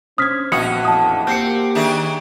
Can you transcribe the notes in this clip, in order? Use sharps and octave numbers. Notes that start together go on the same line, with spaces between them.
C#4 D4 C5 D#6 F6 G#6 B6
A#1 B2 F#4 G5 D#6 C#7 F7
A1 F2 A5 D#6
A#3 C4 G4 G6 C7 C#7
D#3 D4 G#4 E5